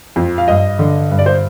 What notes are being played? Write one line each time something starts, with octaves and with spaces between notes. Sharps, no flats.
F2
F5
G2 D#5
D3
G2
D5
C5